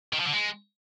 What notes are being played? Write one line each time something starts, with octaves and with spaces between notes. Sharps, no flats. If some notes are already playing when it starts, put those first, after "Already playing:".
D#3
F3
D3
G#3